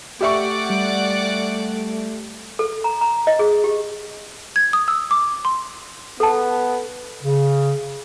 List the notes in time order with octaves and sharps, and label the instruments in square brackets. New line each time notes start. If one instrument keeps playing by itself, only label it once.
[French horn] A3 [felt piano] G4 E5 C#6 [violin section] D5 F#5 D6
[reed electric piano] G3
[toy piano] A4
A#5
A#5
D#5
G#4
G4
[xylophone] G#6
D#6
E6
D6
C6
[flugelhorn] B3 [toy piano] A4 A5
[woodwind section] C#3